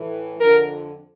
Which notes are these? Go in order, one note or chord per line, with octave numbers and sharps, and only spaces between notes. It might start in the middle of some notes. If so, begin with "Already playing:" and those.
Already playing: A2 E3
F2 D3 A#4